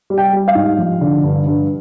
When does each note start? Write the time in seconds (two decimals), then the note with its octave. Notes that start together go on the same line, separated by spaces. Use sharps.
0.10 G3
0.18 G5
0.33 G3
0.48 F5
0.55 G#2
0.78 F3
1.01 D3
1.23 G2
1.46 G2